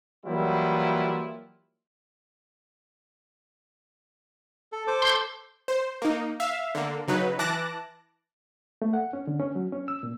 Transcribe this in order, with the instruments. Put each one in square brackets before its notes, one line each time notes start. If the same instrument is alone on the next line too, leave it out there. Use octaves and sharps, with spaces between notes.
[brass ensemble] E3 F#3 G3 A#3 E4 F4
[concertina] A4
A4 C5 D6
[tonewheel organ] C6 G6
[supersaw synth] C5
A#3 D#4
E5 F5
D3 A#3
C#3 F#3 D#4 B4
E3 A5 D6 F#6 A#6
[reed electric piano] A3
F#5
C#4
D3
C#4
F#3
C#4
E6
A#2